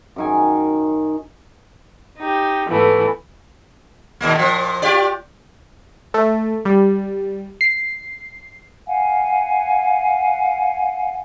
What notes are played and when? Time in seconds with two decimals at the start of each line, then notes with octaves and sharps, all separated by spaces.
0.16 F#2 D#3 G#5
2.18 D#4 G4
2.68 G#2 E3 A3 B3
4.21 D#2 B2 A#3
4.35 A#2 F3
4.82 F4 G4 D5
6.14 A3
6.65 G3
7.61 C7
8.87 F5 F#5 G#5